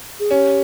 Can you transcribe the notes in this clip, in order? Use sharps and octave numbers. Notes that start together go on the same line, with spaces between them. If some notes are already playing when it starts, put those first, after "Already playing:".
G#4
C#4 G4